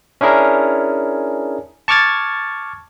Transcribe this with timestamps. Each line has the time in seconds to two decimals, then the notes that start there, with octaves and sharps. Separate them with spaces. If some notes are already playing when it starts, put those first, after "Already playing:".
0.21 C#4 D4 E4 G#4 A#4
1.88 A5 C#6 D6 F6 G#6 A6